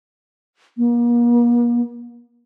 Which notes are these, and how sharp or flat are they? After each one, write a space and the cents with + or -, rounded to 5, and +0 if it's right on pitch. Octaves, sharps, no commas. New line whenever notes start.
A#3 +40